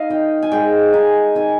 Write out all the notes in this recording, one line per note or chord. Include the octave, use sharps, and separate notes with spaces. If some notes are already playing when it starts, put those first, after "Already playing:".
Already playing: D#4 D#5 F5
D#3 G5
G#5
G#3 G5
D#4 G#5
D#3 G#5